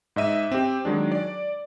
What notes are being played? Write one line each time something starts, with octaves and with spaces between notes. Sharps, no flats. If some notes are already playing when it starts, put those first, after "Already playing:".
G#2 D#5 E5 D#7
C4 G4
D#3 F#3 G#3 D4
D5